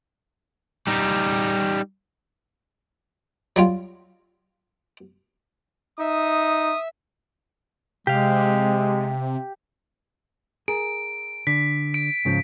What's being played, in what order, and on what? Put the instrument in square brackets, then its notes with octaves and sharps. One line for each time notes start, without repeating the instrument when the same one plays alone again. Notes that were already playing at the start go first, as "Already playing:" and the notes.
[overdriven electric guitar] G3 D#4
[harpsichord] F#3 G3 F4
[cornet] D#4 [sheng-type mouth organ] E5 [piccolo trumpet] D#6
[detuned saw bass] C3 [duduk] G#3 [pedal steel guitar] G4 F5
[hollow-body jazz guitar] G#4 A#4 [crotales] D7
[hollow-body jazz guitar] D3 [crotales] B6
[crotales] D7
[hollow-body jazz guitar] G#2 C#3 F3